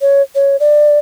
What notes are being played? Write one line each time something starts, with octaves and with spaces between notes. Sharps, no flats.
C#5
C#5
D5